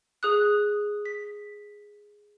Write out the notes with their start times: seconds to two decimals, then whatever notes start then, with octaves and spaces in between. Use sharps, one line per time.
0.23 G#4 D#6 F#6
1.06 B6